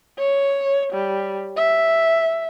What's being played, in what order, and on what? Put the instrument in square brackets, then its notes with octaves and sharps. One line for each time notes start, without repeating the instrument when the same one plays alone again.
[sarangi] C#5
G3
E5